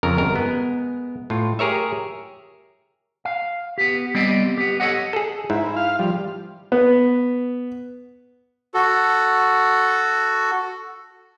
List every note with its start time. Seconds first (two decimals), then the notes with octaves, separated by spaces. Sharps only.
0.03 F2 C#3 A#4
0.18 G1 A#4
0.36 G#3 B3
1.30 A2 F4
1.59 G4 G#4 A#4 C#5 E5
3.25 F5
3.78 B3 G4
4.15 G3 B3 C4 G4 D5 D#5
4.58 B3 G4
4.80 A4 C#5 D#5 F#5
5.13 G#4 A4
5.50 G#2 E4
5.76 F5
5.99 F3 G3
6.72 B3
8.74 F#4 A4